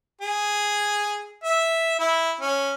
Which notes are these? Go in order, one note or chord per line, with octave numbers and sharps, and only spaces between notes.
G#4
E5
E4
C#4